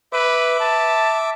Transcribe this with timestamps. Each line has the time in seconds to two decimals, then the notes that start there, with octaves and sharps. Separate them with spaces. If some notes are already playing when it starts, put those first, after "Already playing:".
0.13 B4 E5 D6
0.60 A5